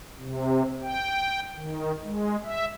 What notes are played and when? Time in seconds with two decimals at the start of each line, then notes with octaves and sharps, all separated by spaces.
0.20 C3
0.83 G5
1.56 D#3
2.03 G#3
2.44 E5